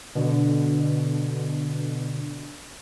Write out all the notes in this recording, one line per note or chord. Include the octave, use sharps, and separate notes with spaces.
B2 D3